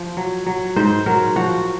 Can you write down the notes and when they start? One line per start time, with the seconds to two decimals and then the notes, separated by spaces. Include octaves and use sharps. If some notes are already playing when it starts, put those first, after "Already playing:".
Already playing: F3
0.17 F#3
0.46 F#3
0.76 G#2 C5
1.06 F#3 A#4
1.36 F3 F#4